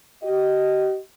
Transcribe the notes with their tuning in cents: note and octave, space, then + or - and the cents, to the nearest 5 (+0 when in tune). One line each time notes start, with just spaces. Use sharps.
G4 -35 D#5 +0